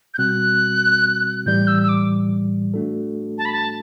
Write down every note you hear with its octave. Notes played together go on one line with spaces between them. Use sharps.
G6
B2 G3 C4 F#4 F#6
A2 E3 G3 G6
E6
E6
D6
A3 D4 F#4 A4
A5
B5
A5